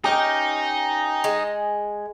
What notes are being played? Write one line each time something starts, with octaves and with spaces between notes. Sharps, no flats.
C#4 D#4 G4 A#4 D#5 G5
G#3